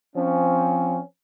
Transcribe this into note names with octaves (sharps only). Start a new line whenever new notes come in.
F3 C4 C#4